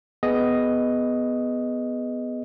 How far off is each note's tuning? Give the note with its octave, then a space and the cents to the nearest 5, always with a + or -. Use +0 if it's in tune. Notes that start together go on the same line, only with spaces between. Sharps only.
B3 +5 G#4 +10 D#5 +0